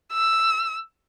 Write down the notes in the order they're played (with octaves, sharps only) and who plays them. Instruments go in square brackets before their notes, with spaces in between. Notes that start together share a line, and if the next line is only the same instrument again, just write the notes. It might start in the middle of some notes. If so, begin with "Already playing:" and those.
[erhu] E6